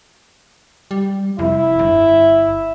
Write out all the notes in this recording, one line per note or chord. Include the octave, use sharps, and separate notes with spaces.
G3
F1 E4
G1